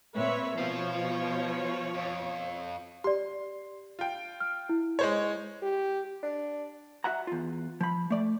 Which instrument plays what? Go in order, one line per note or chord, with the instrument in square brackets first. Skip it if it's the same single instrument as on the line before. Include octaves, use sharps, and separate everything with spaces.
[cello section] A#2 C4 [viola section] B4 C#5 E5
[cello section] B2 [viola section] F3 C#5 [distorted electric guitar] C5 F5
[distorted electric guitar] F2
[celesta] G4 D5 [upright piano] C6
[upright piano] F4 G5
[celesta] F6
E4
[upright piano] G#3 C5 C#5
[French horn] G4
[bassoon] D4
[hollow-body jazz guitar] F#4 E5 F#5 A#5
E2 F4
F3 B5
A3 D5